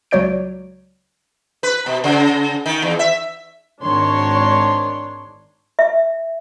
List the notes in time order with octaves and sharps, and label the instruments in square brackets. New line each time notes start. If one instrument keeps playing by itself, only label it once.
[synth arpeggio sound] C#2 F#3 C#5 D5 G6 D7
[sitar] B4
B2
C#3
D#3
E2
E5
[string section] G#1 D#3 D4 C#5 C6
[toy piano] E5